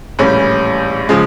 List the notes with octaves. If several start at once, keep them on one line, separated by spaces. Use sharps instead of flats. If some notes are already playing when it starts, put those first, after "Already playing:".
A#1 A2 E3 G3 C#4
C#3 F3 G#3